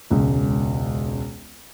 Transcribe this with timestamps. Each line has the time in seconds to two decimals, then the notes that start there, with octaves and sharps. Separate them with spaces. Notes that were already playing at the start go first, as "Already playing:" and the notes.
0.10 E1 C#2